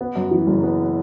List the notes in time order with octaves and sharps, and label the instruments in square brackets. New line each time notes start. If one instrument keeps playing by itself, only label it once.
[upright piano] B3
F#2
E3
F#1
B3